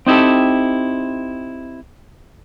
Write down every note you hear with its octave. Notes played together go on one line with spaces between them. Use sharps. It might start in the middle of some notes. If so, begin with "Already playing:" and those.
C4 D#4 E4 G4 A4